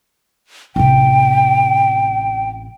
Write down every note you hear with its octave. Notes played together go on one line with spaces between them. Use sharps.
A1 C3 G5